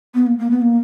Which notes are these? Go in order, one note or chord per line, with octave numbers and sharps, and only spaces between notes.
B3
A#3
A#3
B3
A#3